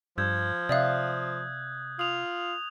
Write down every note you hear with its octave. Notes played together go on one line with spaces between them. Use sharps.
G2 F3 E6 G6 G#6
C3 D5 E5 F5 D#6 F#6
F4 D#6 F7